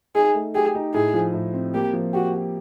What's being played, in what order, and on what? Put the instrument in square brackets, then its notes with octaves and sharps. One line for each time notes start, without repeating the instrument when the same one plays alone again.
[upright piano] D#4 [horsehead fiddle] G#4
[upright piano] A3
[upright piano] G4 [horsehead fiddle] G#4
[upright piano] D#4
[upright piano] A2 [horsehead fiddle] G#4
[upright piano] F3
A2
C4
[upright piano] A#3 [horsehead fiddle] G4
[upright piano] F3
[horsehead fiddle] F#4 [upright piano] G4
[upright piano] G4